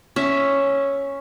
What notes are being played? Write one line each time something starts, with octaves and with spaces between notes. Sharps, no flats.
C#4 E5